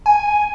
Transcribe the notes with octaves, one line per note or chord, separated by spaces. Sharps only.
G#5